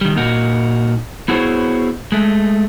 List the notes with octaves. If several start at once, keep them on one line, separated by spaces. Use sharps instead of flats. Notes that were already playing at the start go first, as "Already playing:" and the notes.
D#3 G3
A#2 A#3 D#4 F#4
B3 E4 F#4 G#4 C5 C#5
G#3 A3